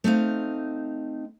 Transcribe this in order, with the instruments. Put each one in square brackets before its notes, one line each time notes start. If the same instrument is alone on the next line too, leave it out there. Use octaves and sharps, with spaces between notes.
[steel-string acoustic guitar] A3 C4 D#4 F5